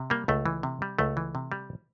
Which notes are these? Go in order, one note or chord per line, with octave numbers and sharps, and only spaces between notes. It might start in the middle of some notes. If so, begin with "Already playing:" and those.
Already playing: C3
G3 A#3
C#2 A3
E3
C3
G3
C#2 A3
E3
C3
G3